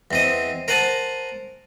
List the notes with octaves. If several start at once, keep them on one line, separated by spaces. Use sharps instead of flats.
E2 C4 D#5
A#4 C5 F#5 G#5 A5